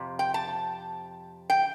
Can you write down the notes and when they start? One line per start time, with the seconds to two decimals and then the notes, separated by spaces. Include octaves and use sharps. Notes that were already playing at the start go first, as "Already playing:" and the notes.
Already playing: F2 C3
0.19 G5
0.34 A5
1.50 G5